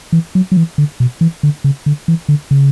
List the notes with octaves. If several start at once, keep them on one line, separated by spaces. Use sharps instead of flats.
E3
F#3
F#3
E3
D3
B2
E3
D3
C#3
D3
E3
D3
C#3